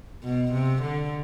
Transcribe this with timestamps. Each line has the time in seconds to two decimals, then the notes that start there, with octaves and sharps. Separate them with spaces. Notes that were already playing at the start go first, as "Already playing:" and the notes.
0.23 B2
0.52 C3
0.82 D3